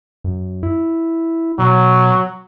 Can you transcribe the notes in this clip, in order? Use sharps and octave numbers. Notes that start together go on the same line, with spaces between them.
F#2
E4
B2 F#3